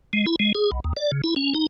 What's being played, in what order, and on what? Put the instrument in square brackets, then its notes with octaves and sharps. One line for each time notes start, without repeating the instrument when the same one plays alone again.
[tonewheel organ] G#3
E4
G#3
G#4
B1
D#2
D5
C#3
E4
C#4
D#4